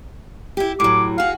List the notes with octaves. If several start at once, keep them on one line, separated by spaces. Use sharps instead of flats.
E4 G4
A2 F#3 D6
F#4 G#4 F5